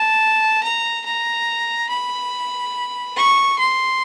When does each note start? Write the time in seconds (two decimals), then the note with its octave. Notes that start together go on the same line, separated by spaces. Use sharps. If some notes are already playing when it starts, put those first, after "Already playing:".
Already playing: A5
0.63 A#5
1.05 A#5
1.90 B5
3.17 C#6
3.59 C6